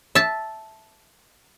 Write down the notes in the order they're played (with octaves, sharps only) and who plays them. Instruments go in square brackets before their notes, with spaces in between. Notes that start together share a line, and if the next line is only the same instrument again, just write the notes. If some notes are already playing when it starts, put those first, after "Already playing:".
[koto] E5 A5